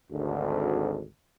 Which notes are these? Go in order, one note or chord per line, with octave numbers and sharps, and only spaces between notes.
G#1 D2